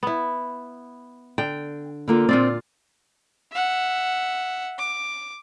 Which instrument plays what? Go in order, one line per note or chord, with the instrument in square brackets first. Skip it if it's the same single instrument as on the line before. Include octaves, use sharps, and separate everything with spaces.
[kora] B3 E4
[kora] D3 [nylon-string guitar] G5
[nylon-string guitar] D3 A#3 F4
[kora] A#2 F4 D5 [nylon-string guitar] C4
[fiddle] E5 F#5
D6